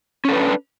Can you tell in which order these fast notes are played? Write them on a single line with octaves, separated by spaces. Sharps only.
C#4 A4 B4 D4